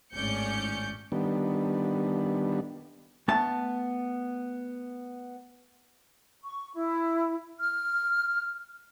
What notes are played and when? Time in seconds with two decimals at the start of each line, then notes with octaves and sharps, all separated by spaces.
0.13 G#1 A2 C#4 D5 G6 C#7
1.12 D#3 G3 B3 D4
3.28 A3 B3 A5
6.43 C#6
6.75 E4
7.59 F6